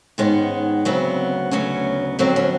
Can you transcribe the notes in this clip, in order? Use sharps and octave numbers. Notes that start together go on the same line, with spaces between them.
G#2 D#3 G#3 B3 C#4
D2 C#3 F#3 B3 C4
D2 C#3 F#3 B3 C#4
F2 D3 F#3 B3 C4
C#4